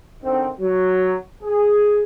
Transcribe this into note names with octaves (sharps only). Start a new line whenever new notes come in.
D3 D#3 C4
F#3
G#4